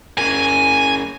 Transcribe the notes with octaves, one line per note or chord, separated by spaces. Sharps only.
C#4 G#4 A#4 G#5